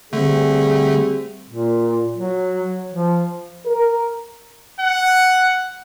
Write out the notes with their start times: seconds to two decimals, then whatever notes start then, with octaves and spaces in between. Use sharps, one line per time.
0.13 D3 G3 A3 C4 G#4
1.49 A#2
2.15 F#3
2.92 F3
3.66 A#4
4.81 F#5